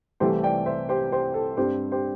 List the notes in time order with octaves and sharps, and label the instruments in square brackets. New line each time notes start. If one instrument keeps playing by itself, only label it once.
[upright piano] C2 C3 E3 A3 C4 G4 C5
D5 G5
C5 E5
G4 C5
G4 C5
A4
G2 G3 C4 G4 C5
G4 C5